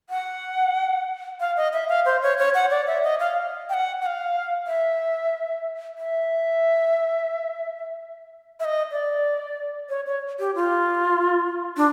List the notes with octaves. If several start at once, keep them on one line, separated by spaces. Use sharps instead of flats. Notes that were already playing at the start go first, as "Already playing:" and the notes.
F#5
F5
D#5
E5
F5
C5
C#5
C#5
F#5
D5
E5
D#5
F5
G5
F#5
F#5
F5
E5
E5
E5
D#5
D5
C#5
C#5
G4
F4
D4